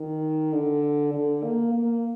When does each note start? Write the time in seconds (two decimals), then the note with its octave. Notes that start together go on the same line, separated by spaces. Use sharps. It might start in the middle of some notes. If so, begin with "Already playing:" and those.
Already playing: D#3
0.53 D3
1.14 D3
1.44 A#3
1.73 A#3